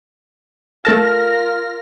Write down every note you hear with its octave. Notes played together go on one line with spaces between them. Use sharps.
A3 F4 A4 A#4 A5 F6 A#6